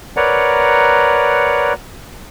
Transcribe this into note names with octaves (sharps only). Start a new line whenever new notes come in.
A#4 B4 C#5 D5 F#5 A#5